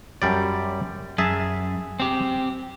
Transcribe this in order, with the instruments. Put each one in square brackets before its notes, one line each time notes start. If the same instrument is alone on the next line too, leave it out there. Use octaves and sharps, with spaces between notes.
[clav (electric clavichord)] F#2 G3 D5
[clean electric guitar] F#2 [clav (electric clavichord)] G#4 E5 A5
[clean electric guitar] C4 G4